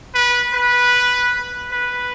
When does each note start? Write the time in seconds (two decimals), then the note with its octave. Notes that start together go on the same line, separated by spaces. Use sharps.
0.14 B4
0.54 B4
1.72 B4